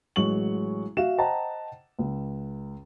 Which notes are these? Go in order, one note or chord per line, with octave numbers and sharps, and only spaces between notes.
A1 F#3 G#3 C#6 F#7
F#4 E5 F5 E7
C5 D#5 F#5 G5 A5 A#5
C#2